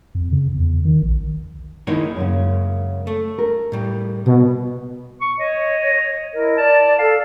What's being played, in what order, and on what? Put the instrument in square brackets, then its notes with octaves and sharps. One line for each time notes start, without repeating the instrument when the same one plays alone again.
[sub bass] F2
C#3
E2
D#3
A#1
[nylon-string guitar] D#3 D#4 E4 [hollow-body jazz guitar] G#3 A#3 C#5
[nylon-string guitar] F#2 C#3
[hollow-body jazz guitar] A3
[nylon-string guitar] A#4
[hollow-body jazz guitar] A2 G3
[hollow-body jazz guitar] C2 [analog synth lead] B2
[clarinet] C#6
[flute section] C#5 [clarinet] D#5
[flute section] E4 A#4 D#5
[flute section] D5 [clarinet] A5
[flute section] A4 [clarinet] F5